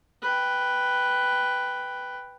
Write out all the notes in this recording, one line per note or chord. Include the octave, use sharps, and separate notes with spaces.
B4 G5